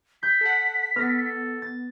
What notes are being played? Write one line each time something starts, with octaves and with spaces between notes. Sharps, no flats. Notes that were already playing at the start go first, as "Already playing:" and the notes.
G6 B6
A4 F#5
B3 A4 F6 A#6
A6